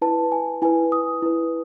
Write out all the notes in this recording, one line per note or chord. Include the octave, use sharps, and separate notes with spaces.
E4 B4 A5
G#5
E4 B4 G#5
D#6
E4 B4